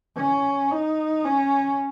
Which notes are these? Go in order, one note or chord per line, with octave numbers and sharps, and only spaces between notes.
C#4
D#4
C#4